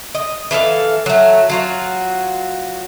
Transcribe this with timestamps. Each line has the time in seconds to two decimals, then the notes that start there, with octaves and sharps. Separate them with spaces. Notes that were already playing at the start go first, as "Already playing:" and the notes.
0.15 D#5
0.51 E3 A4 C5 F5
1.06 F#3 A3
1.49 F#3 F4 F#4